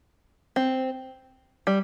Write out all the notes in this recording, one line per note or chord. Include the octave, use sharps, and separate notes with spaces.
C4
G3